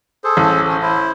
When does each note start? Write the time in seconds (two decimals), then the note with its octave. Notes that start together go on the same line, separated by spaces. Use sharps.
0.24 G#4 A4 C5
0.37 A1
0.68 C#4 C5
0.82 E4 C5